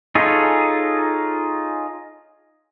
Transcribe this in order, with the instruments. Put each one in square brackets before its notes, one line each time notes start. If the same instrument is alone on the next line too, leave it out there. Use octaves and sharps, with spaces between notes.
[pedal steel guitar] D#4 F4 G#4 A4 C#5